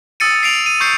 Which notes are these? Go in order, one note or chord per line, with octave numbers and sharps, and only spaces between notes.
D#6 E6 A6 C#7 D#7
C7 D7 F7
D#7
C#6 G6 C7 C#7 D#7